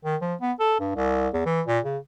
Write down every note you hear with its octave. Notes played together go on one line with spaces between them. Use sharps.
D#3
F3
B3
A4
G2
C2
E2
E3
A#2
C#3